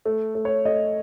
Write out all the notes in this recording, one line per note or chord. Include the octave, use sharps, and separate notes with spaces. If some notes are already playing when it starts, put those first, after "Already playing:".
A3
A3
C#5
A3 D#5